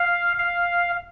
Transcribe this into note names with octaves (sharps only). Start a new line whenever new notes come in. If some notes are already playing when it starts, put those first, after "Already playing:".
Already playing: F5
F5